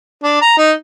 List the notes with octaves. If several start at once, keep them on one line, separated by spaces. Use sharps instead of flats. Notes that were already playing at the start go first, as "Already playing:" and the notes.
D4
A#5
D#4